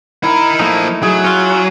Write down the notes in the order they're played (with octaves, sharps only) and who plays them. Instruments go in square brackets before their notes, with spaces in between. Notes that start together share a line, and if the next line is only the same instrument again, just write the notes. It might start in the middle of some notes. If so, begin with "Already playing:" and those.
[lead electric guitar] D#4 A#4 [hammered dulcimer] E4
[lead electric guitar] F3 A#3 [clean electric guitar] A3 D#4
[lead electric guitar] F#3 [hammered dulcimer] G#4
[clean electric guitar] C#4 F4